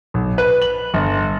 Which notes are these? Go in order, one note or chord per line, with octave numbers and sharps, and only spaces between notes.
B1
B4
F#7
G1